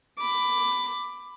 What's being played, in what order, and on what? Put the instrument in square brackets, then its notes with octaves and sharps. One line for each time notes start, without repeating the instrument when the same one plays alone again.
[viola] B5 D6